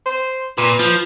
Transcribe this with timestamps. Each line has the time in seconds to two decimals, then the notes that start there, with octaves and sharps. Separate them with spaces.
0.06 C5
0.58 A#2 B4
0.79 F3